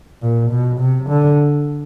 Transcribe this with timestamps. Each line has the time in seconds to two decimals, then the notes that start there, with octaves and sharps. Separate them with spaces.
0.22 A#2
0.51 B2
0.80 C3
1.09 D3